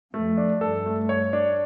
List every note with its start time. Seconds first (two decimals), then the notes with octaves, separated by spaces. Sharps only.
0.14 F2 A3
0.37 D4
0.61 G2 A4
0.86 A3
1.09 C#5
1.33 D4